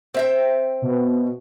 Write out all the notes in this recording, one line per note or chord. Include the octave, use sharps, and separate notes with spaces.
C4 E5 G5
B2